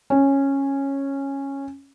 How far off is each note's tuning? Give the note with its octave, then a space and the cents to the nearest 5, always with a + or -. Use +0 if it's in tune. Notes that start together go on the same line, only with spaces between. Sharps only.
C#4 -10